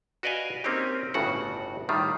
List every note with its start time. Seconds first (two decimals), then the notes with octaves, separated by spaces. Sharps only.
0.23 F#4 B4 D5 D#5 F5 G#5
0.64 A#3 C4 C#4 D#4 G4
1.14 G1 A2 C#3 D4 F#4 F#5
1.89 A2 D#3 G3 F4